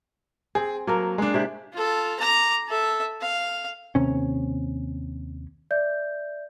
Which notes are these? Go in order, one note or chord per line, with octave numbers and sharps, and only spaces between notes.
C4 G#4
F#3 A#3 A4 A#4
G#3 D4
C3 E4 G4
F4 A4
A#5 D6
A4 E5
F5
D#2 C3 C#4
D5 E5 G6